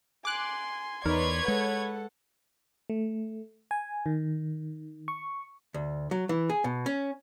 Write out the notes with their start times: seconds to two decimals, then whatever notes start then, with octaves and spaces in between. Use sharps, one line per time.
0.25 G#5 C6 D6 F#6
1.06 E2 D#4 A#4 B4 C#5 D5 C6 G#6
1.48 G#3 A4 F#5
2.90 A3
3.71 G#5
4.06 D#3
5.08 C#6
5.74 D2
6.11 F#3
6.29 E3
6.50 G#4
6.64 B2
6.86 C#4